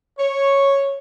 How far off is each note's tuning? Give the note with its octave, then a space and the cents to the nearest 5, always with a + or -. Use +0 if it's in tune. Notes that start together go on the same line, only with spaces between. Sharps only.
C#5 -5